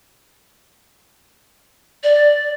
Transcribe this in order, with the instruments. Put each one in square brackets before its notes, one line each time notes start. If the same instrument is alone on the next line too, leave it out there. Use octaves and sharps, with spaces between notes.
[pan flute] D5